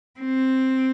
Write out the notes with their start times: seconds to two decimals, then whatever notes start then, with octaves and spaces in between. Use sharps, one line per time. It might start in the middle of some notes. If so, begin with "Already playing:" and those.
0.20 C4